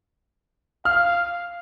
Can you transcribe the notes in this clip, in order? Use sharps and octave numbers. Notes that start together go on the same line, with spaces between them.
F5 F6